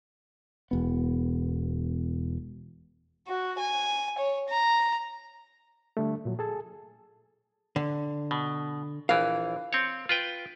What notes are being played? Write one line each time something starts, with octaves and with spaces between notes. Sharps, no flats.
E1 B3
F#4
G#5
C#5
A#5
D3 G3 A3
A#2 F3 F#3
G#4 A4 G#5 A5
D3
B2
A#1 E3 F5
C4 C#5
F4 B4 G5